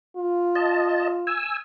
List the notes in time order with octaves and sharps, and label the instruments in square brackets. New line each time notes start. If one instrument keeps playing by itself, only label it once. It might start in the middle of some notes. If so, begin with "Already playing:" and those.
[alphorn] F4
[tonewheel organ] D#5 A5
G#5 E6